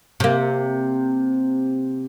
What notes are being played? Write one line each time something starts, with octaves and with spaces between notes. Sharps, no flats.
C3 A#3